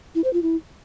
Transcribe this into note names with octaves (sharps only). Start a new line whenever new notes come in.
E4
C5
F4
E4